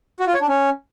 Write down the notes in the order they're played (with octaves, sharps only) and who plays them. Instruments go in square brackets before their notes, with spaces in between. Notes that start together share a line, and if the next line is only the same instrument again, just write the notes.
[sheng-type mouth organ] F#4
F4
C#5
D4
C#4